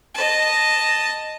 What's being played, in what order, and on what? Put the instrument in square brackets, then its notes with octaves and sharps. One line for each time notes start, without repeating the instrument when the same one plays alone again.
[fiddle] D#5 A5